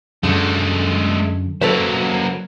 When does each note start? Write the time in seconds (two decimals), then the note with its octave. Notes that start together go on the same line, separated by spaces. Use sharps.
0.23 F#2 D3 G#3 A3
1.62 F#3 A#3 A4 B4 C5